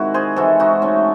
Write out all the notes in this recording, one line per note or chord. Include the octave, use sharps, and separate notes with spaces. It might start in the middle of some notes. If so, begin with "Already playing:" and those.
Already playing: C3 D#3 G#3 E4 F#4
G#4 C5
C3 E3 G#3 F#4 A4
D#4 F#4
A3 C#4